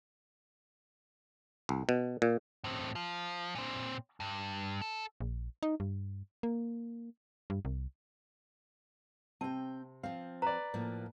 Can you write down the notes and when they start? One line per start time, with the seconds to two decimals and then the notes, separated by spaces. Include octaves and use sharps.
1.69 C2
1.89 B2
2.22 A#2
2.64 A2 C4
2.95 F3
3.55 A#2 C4
4.20 G2
4.82 A4
5.21 A#1
5.63 D#4
5.80 G2
6.43 A#3
7.50 G2
7.65 C2
9.41 C3 C4 G5 A5
10.03 F3 C4 F5
10.42 B4 D5 A#5
10.74 A2 F3 A#3